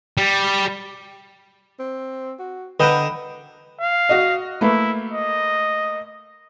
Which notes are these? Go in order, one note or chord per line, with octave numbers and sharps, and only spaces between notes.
G3
C4
F#4
D3 B4 D#5 G5 A#5
F5
F#4 D#5
A3 A#3 E4 B4
D#5